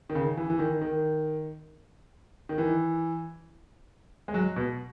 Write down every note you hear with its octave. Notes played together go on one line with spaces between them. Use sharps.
D#3
C#3
E3
E3
D#3
D#3
D#3
E3
G#3
F#3
B2